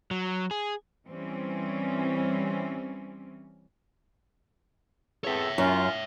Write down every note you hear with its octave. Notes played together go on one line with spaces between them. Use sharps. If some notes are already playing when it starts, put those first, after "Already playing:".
F#3
G#4
E3 G3 C4 C#4
E2 C4 A4 C#5 E5
F#2 C#4 F4